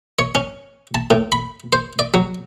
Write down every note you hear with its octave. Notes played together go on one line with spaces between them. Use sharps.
C#5
C#4
A5
A2
B5
C5
D5
F#3